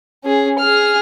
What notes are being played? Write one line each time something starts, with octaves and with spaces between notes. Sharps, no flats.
C#4 G#4
G#4 F6